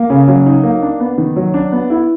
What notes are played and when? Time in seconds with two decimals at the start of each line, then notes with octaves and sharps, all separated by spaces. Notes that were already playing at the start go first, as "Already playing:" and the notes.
Already playing: A#3
0.10 C#3
0.28 F#3
0.46 D#4
0.63 A#3
0.82 D4
1.00 B3
1.18 D#3
1.36 F#3
1.54 D4
1.72 B3
1.90 E4